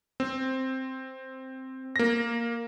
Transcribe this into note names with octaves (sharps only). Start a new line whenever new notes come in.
C4
A#3 A#6